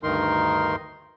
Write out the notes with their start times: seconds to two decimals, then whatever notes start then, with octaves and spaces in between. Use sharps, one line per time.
0.03 D2 G2 D#3 D#4 A#4 C6